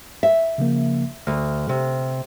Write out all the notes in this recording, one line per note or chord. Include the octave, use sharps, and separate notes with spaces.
E5
C#3 F3 A#3
D2 F6
C3